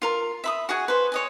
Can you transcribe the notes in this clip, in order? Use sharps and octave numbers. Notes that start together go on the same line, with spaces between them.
F4 A#4
E5 B5 D#6
F#4 G#4 F#5 G#5
B4 C5
C#5 D#5 G#5